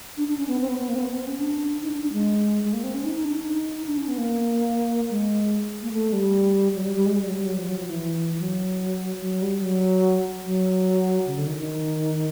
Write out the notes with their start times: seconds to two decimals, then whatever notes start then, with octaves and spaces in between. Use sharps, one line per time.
0.17 D4
0.28 D4
0.38 C#4
0.48 B3
0.61 C4
0.68 B3
0.79 B3
0.88 A#3
0.95 C4
0.99 B3
1.13 C4
1.27 C#4
1.40 D4
1.82 D#4
1.92 D4
2.02 D4
2.13 G#3
2.64 G#3
2.73 A#3
2.84 C4
2.94 C#4
3.05 D#4
3.15 D#4
3.25 D4
3.36 D#4
3.87 D4
3.97 C#4
4.08 B3
4.18 A#3
5.11 G#3
5.82 A#3
5.92 A3
6.13 G3
6.74 F#3
6.84 G3
6.95 G3
7.06 G#3
7.16 G3
7.25 F#3
7.36 G3
7.46 F#3
7.57 F3
7.67 F#3
7.78 F3
7.87 E3
8.39 F#3
9.21 F#3
9.42 G3
9.62 F#3
10.44 F#3
11.27 C#3
11.37 D3
11.47 D#3
11.57 D#3